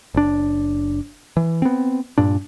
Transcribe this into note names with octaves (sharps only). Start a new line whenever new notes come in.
F#1 D4
E3
B3 C4
G2 A#2 D4